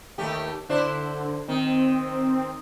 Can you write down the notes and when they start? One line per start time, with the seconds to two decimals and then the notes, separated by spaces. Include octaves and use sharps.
0.18 D#2 A3 G4
0.69 D3 D4 E4 C5
1.48 D#3 C4